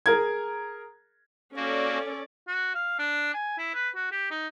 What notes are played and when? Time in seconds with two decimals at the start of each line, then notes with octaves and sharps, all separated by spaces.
0.06 G#4 A#4 G#6
1.56 A#3 C#4 F#4 A4 D5
2.48 F#4
2.75 F5
2.99 D4
3.34 G#5
3.58 E4
3.74 B4
3.95 F#4
4.11 G4
4.30 D#4